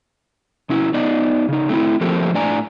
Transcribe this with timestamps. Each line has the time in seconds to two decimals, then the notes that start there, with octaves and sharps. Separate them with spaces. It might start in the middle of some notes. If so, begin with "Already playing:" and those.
0.69 C3 C#4 E4
0.94 B3 D#4 D5 D#5
1.49 C#3 D#4
1.69 A3 C4 E4
2.01 F3 A3 A#3 C4 G4 A4
2.34 A2 D4 D5 G#5 A#5